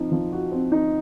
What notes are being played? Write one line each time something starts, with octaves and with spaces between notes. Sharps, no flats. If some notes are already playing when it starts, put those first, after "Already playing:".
Already playing: F3 C4 D#4
F3
F#4
C4
D#4